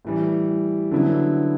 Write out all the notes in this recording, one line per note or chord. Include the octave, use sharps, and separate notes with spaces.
A2 E3 G3
D3 F#3 B3 E4